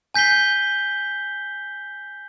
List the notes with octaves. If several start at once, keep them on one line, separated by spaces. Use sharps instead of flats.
G#5 G6 B6 C7 G7